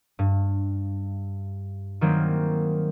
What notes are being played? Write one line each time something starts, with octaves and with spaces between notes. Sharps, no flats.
G2
D#3 F#3 G3 A#3 C4